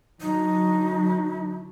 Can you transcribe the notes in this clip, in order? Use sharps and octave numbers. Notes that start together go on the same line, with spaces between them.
D3 F#3 D#4